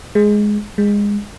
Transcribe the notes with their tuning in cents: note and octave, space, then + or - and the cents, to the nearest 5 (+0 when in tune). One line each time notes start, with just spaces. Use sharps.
G#3 +5
G#3 -20